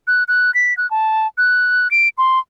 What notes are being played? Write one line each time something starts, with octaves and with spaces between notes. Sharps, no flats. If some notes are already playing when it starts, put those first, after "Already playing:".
F#6
F#6
B6
F#6
A5
F#6
D7
C6